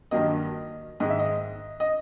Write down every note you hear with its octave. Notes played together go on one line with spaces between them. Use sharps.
G2 D#3 F#3 A#3 D#5
G#2 D#3 G#3 D#5
E5
D#5
D#5